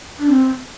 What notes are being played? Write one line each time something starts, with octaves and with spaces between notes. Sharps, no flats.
D4
C4